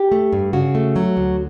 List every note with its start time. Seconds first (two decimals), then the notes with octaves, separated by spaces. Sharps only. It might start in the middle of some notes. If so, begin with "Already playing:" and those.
Already playing: G4
0.12 A3
0.33 G2
0.53 C#3 F#4
0.75 A3
0.96 F#3
1.17 D2